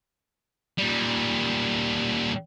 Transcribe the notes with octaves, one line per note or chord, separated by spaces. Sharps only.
A#2 G3